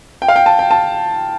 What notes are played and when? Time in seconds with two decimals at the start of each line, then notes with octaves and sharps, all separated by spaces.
0.22 G5
0.28 F5
0.36 G5
0.46 A5
0.59 G5
0.71 A5